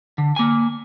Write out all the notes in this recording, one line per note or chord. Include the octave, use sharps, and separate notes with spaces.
D3
A#3 G#5